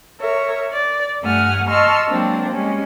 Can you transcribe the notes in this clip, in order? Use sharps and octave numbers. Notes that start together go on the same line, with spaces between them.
A#4 C#5 E5
D5
G2 A3 F#5 G#5 F6
D#5 A5 C6 C#6 E6 F6
F#3 G#3 A#3 C4 D4
G3 G#3 C#4